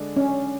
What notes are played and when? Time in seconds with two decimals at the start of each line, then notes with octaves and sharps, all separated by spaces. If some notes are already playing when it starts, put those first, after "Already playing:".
Already playing: D3 G#3 D4
0.16 C#4